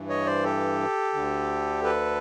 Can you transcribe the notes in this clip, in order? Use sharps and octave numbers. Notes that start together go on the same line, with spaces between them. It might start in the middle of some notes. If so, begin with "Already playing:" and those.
Already playing: G2 E3
C#5 D#5
C5 D5
G4 A4
D2 D3
A4 B4